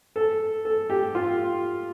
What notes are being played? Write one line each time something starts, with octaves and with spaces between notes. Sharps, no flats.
A4
A4
G4
F4